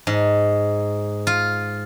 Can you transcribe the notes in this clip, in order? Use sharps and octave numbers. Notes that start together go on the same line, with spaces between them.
G#2
F4